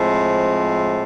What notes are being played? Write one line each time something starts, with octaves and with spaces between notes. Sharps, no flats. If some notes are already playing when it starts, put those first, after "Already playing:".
Already playing: A2 F3 G#3 C4